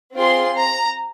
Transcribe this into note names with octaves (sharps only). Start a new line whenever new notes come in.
C4 F4 G#4 C6
A#5